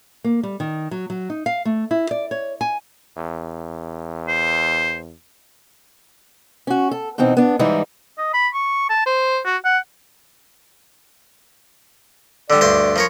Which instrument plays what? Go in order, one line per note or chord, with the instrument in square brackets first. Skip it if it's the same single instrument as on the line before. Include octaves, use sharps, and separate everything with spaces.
[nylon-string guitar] A#3
G3
D#3
F#3
F#3
D#4
F5
A3
E4
D5
C#5
G#5
[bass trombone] E2
[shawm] C5
[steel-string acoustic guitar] C#4 F#4
A4
B2 E3 C4 D#4
B3 D4
G#2 E3 G3 D#4 E4
[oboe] D#5
B5
C#6
A5
C5
F#4
F#5
[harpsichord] D3 G3 [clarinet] D5
[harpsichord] D2 G2 C5
F3 A#4 C#5